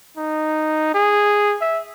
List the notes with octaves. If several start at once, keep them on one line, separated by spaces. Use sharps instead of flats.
D#4
G#4
E5